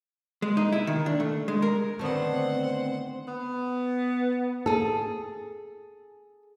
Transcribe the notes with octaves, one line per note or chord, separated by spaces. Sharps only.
G#3
D#4
E4
D#3
D4
A3
G#3
A#4
D3 D#3 A3 B3 C4 C5 F#5
B3
G#4 A4